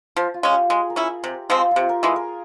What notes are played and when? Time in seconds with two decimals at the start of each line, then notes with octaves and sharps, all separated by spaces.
0.16 F3
0.34 F4
0.43 G#3 C#4
0.52 G4
0.70 G#3 G#4
0.90 A#4
0.96 C#4 E4 G#4
1.23 C3 G4
1.49 F3 G#3 C4 F4
1.71 C3 F4 G4
1.89 A#4
2.03 E3 G#3 G#4
2.16 A#4